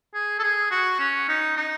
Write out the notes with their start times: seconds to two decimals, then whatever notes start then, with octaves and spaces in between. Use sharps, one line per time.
0.14 G#4
0.39 A4
0.43 G#4
0.71 F#4
0.99 C#4
1.28 D#4
1.57 D#4